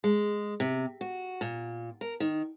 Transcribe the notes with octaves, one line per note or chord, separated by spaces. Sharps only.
G#3
C3
F#4
A#2
A#4
D#3